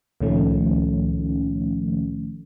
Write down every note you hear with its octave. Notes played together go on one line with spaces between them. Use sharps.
C#2 A#2 D#3 F3 A3 C#4